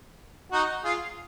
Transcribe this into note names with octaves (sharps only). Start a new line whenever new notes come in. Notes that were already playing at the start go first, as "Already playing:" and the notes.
D#4 F#4
F4 G#4